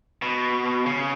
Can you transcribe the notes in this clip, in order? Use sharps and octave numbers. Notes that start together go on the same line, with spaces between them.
B2
C#3